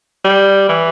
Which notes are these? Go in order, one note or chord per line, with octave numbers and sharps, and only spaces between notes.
G3
E3